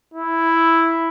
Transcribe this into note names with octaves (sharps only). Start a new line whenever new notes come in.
E4